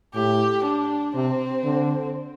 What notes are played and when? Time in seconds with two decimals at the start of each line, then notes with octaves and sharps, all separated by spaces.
0.14 A2 G4
0.65 D4
1.15 C3 C4
1.64 D3